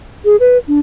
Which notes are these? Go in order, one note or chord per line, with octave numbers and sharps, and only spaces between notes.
G#4
B4
D4